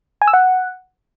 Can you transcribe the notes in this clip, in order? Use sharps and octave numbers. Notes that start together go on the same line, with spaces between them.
G#5
E6
F#5